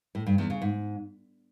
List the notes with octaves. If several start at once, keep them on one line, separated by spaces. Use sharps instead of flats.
A2
G2
E2
C#3
G#2